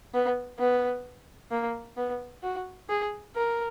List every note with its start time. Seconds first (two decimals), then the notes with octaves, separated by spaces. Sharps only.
0.14 B3
0.59 B3
1.51 A#3
1.97 B3
2.43 F#4
2.90 G#4
3.35 A#4